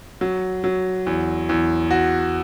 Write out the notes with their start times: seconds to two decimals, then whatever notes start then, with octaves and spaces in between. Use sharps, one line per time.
0.21 F#3
0.64 F#3
1.06 E2
1.49 E2
1.91 F#4